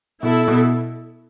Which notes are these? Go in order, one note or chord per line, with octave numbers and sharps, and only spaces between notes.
B2 E4 A4
B2